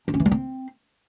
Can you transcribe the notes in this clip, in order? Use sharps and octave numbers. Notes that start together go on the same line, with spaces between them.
D4
C#4
E3
G3
C4